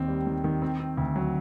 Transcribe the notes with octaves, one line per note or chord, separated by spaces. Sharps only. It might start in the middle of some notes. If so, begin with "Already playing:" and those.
Already playing: D#2 D#3 C4
G3
D#3
D#3
C4
C4
D2
F#3